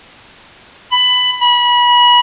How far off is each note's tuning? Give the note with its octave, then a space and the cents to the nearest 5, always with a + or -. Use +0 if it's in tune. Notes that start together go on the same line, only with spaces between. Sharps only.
B5 +15
B5 -30